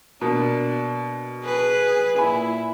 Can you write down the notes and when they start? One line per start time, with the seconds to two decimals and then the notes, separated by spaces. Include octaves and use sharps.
0.21 B2 A#3 D4
1.44 G#4 B4
2.17 A#2 E4 G#5 B5